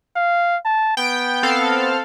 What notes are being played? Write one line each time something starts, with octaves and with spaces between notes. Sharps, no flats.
F5
A5
B3 G5
C4 A4 F5